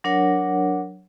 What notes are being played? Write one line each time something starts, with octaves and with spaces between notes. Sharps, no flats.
F#3 D4 A#4 C#5 F#5